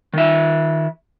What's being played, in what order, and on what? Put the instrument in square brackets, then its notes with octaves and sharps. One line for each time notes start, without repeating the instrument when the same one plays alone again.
[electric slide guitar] D#3 E5